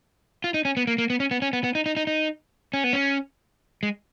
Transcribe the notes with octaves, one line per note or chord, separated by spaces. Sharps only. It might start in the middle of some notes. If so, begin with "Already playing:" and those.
F4
D#4
C#4
B3
A#3
A#3
B3
C#4
B3
C#4
B3
B3
D#4
D#4
D#4
D#4
C#4
B3
C#4
G#3